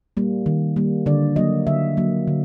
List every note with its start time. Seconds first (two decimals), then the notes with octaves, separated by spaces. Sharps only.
0.17 G3 A#3
0.46 D#3
0.76 G3 A#3
1.06 D3 D5
1.36 F#3 A#3 D#5
1.67 D3 E5
1.97 F#3 A#3
2.28 D3